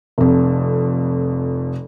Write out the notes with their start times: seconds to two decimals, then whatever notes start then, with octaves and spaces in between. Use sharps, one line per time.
0.18 F1 F2